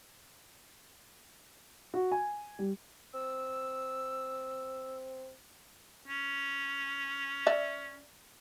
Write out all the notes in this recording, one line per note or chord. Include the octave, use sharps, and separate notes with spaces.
F#4
G#5
G3
C4 E6
C#4
D5 E5